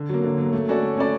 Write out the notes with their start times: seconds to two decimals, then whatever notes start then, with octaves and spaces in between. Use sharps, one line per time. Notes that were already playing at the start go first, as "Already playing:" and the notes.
Already playing: D3
0.09 F#3 A#3
0.24 D3
0.38 F#3 A#3
0.53 A3
0.69 C#4 F#4 A4 D5
0.82 A3
0.97 C#4 F#4 A4 D5